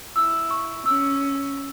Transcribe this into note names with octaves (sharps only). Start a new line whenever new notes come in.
E4 E6
C#6
C#4 E6